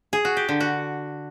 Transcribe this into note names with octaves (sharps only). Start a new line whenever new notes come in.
G#4
F#4
G4
D3
F#4